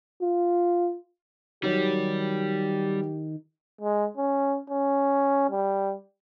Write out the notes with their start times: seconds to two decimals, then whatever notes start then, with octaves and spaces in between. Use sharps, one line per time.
0.22 F4
1.63 D#3 F#3 G3 G4
3.81 G#3
4.17 C#4
4.70 C#4
5.50 G3